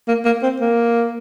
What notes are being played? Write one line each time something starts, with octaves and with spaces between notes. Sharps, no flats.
A#3
A#3
C4
A#3